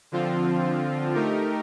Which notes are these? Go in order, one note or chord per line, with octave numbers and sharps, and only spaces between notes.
D3 F3 C4 F4
A3 D#4 G4 A#4